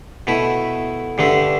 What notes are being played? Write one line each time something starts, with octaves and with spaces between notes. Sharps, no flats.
B2 A3 E4
G2 D3 A3 D4